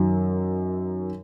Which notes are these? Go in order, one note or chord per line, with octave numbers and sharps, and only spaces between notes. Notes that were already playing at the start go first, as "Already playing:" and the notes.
Already playing: F#2 D#3 F#3